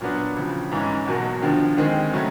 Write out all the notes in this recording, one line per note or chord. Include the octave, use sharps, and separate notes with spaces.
A#2 F#3 B3 D4
C#2 C#3 F3
G#2 E3 G#3 C#4
E2 B2 F#3 A#3
D#2 D3 F3
D#2 D#3 G#3 C4
C#3 F#3 A3 C#4